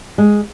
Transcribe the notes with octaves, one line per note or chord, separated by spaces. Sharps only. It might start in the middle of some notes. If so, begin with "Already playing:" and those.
G#3